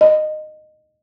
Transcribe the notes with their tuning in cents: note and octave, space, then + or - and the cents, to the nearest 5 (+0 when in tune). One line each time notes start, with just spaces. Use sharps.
D#5 -15